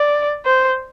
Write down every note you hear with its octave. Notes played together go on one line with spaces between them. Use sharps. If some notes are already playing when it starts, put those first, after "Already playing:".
Already playing: D5
C5